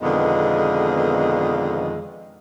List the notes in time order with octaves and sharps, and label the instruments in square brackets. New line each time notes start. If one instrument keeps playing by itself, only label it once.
[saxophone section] F2 B2 D3 D#3 G#3 B3